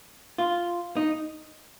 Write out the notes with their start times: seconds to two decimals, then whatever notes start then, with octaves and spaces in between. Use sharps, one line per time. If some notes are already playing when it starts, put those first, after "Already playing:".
0.38 F4
0.97 D#4